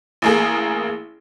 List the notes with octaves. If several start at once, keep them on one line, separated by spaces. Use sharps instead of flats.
A1 A#3 G#4